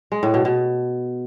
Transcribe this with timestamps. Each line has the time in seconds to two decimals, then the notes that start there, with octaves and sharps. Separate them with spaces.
0.12 G#3
0.23 A2
0.34 B2
0.45 B2